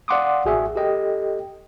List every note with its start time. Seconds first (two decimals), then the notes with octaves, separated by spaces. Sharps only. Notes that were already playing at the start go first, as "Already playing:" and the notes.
0.08 D5 F5 F#5 C6 D6 D#6
0.45 A1 F#4 G#4 E5
0.76 G4 A4 D#5 G5